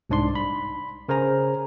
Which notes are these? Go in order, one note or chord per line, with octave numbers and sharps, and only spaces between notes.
C2 G#2 D4 D5 C6
B5
C#3 A#4 C5 G#5 A#5